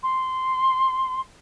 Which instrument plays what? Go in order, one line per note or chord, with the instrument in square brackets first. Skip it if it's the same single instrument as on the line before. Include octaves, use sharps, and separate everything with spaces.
[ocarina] C6